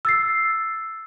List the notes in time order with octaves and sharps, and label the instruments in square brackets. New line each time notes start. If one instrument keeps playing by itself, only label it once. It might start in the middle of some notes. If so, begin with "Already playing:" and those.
[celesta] E6 A6 C7